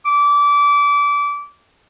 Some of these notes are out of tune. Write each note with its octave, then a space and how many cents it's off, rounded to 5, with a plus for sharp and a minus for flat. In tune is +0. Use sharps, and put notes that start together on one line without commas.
D6 -25